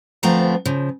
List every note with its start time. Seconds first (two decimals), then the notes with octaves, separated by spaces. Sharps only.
0.23 D2 F3 A3 B3 C4 A#5
0.66 C#3 F3